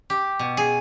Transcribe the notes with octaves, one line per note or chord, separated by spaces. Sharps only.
G4
B2
G#4